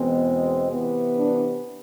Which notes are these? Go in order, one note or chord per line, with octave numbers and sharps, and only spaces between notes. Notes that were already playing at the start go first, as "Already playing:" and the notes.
Already playing: E2 B2 G#3 C4
C3 E3 B3
D4